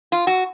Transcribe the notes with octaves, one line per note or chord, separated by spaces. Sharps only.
F4
F#4